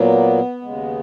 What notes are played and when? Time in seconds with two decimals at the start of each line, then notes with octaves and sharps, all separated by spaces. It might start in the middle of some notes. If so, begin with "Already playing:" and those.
Already playing: A#2 F#3 A#3 B3
0.62 D#2 C#3 G#3